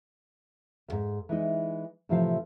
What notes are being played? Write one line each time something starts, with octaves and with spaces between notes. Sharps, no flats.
D2 G#2
E3 G#3 D#4
A2 C3 E3 F3 C5 F5